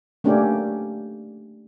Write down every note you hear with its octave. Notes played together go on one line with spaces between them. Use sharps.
A3 A#3 C#4 D4 G4